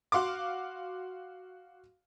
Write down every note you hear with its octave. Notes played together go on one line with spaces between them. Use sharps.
F#4 F5 C6 D6